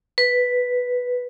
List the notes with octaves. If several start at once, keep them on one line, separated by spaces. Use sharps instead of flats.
B4